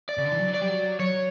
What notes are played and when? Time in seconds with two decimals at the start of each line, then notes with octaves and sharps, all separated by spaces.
0.09 D5
0.18 C#3
0.25 D3
0.32 E3
0.39 F#3
0.54 D5
0.61 G3
0.70 F#3
0.99 F#3 C#5